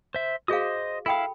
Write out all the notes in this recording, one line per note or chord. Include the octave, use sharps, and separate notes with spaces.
C5 E5
F#4 G#4 C5 D#5 F5 D#6
E4 A4 F5 G5 B5